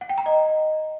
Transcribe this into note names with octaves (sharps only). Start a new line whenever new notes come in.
F#5
G5
A#5
D#5